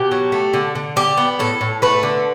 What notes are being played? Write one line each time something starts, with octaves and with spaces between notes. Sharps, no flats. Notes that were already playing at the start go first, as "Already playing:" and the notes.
Already playing: B2 G4
F#3
A3
D3
D3
G3 G4
B3
A2 A4
A2
A3 B4
D3